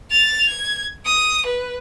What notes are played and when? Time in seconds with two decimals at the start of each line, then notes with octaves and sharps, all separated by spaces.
0.11 A6 F7
0.49 G#6
1.06 D#6
1.46 B4